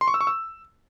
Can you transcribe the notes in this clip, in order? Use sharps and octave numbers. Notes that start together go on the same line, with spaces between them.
C6
C#6
E6
C#6
E6